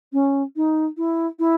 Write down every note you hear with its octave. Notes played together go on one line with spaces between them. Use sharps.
C#4
D#4
E4
E4